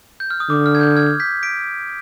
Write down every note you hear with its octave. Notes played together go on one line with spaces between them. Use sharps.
G6
F6
D#6
D3 D6
F6
G#6
G6
F6 G#6
G6 B6
B6 D7